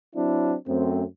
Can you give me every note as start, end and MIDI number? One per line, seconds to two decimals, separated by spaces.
0.16 0.55 54
0.16 0.55 60
0.16 0.55 62
0.16 0.55 64
0.68 1.04 42
0.68 1.04 57
0.68 1.04 60